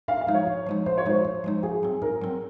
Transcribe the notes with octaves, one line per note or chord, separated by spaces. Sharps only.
G#2 F5
F5
F3 G#3 D#4
C#5
G#2
F3 G#3 D#4
G#2 C5
C#5
F3 G#3 D#4 C5
G#2
F3 G#3 D#4
G#2 G#4
F#3 C4
G#2 A#4
F#3 C4